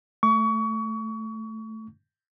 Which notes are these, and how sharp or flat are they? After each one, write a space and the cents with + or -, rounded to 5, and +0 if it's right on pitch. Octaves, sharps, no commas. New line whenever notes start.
A3 +0 C#6 +30